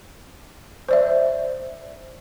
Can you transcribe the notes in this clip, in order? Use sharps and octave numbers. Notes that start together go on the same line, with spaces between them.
C5 D5 E5